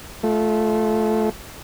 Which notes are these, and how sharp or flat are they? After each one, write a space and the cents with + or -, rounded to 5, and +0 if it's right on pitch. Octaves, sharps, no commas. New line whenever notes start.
A3 -20 F4 +0